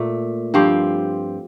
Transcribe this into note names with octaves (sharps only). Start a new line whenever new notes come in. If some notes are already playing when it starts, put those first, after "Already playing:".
Already playing: A#2 A3
G2 F3 C4 G4